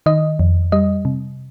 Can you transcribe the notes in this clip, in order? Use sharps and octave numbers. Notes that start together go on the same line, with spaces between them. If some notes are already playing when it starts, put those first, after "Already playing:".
D#3 D#5
F2
G3 D#5
C3